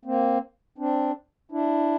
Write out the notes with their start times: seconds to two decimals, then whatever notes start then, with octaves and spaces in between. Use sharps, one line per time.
0.05 A#3 C4
0.78 C4 D4
1.52 D4 E4